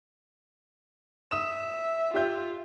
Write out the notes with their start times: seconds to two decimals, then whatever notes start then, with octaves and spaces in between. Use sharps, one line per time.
1.31 E5 D#6 E7
2.14 F4 G4 E5 G6